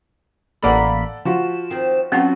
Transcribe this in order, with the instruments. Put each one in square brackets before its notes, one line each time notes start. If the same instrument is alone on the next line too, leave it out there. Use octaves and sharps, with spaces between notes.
[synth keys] A1 A#3 B5 [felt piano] A4 D5 F#5
[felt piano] F3 F4 F#4 [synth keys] E7
[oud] D#3 C4
[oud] F#3 F4 B4 [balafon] C4 C#4 F#5